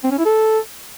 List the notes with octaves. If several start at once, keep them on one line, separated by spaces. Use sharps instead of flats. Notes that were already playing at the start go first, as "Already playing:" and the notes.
C4
C#4
E4
A4